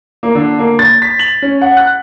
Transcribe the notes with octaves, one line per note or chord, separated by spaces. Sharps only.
A#3
D3
A#3
A6
B6
F#7
C#4
F#5
F#6